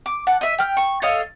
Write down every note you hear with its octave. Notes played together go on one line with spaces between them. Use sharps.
D6
F#5 A5
D#5 E5
G5 F6
C#6
A4 C#5 D#5 F5